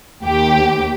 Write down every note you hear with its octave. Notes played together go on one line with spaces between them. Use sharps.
D#2 G4